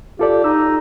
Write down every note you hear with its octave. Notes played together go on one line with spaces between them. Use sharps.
F4 G4 A4 D5
D#4 E6